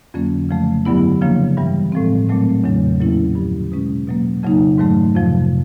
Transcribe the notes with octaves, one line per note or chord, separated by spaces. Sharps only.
F2 D3 F#3 A#3 C#4
C#3 F3 A3
G2 D3 F#3 B3 E4
C#3 F3 A#3 D4
G2 E3 G3
A2 F3 G#3 C4
A#2 F#3 A3 C4
E2 C#3 F#3 A3 D4
A#2 F#3 A#3 C#4 E4
G2 D3 F3
B2 G#3 C#4
B2 F#3 A#3
F2 C#3 F#3 A#3 D#4
G#2 D#3 F#3 A3
F2 C3 F3